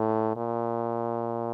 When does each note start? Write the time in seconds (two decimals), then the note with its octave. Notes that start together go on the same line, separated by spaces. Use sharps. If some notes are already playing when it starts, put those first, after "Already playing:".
Already playing: A2
0.36 A#2